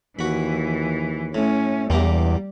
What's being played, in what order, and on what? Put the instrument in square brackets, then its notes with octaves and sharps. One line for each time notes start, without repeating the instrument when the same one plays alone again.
[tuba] D#2 [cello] E3 [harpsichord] F#4 B5
[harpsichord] A2 [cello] C#4
[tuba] E1 [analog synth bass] E2 [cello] G3 [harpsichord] A#3 G4 A#5